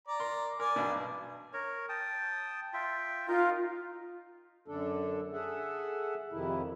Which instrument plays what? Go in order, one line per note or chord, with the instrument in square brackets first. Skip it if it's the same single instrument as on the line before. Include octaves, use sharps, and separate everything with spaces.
[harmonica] D5 A#5
[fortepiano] A#4 C6
[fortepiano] A#4 [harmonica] D5 G#5
[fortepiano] B1 G2 B2
[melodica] A#4 C#5
G5 A5 D#6
F4 E5 G5
[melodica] D#4 A#4 [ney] F4
[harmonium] F#2 D3 D4 A4
G#4 A4 E5 F#5
F2 C3 D#3 E4